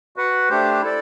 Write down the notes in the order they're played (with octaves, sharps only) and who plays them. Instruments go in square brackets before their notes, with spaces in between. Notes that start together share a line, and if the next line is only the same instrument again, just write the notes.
[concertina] F#4 B4 F#5
A3 D4 G4 C5
E4 A4 D5